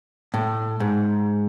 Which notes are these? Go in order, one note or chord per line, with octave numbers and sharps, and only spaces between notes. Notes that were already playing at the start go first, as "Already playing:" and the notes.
A2
G#2